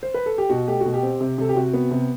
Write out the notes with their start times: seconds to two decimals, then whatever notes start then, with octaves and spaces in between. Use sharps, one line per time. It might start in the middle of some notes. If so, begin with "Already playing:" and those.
0.03 C5
0.14 B4
0.26 A4
0.38 G4
0.49 B2 F#4
0.68 A3 G4
0.80 F#4
0.86 B2
0.94 G4
1.03 C4
1.20 C3
1.38 C3 A4
1.49 G4
1.56 C3 F#4
1.74 B3
1.91 C3